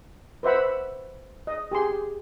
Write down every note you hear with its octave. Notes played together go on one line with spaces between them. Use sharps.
B4 C5 E5 F#5 B5
D#5
G4 G#4 C6